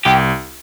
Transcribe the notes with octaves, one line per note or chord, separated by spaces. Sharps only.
C2 G4